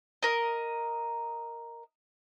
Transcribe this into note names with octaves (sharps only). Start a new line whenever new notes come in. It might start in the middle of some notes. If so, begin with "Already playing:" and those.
A#4 D#5